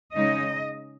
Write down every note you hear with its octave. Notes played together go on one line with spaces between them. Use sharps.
C#3 G#3 D#4 D#5